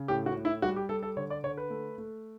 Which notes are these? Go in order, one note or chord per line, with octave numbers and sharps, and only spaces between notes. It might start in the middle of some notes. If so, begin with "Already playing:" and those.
Already playing: C#3
A2 G4
F#4
A2
E4
G3 F#4
G4
G3 A4
A4
D3 C#5
D5
D3 C#5
B4
A3
A3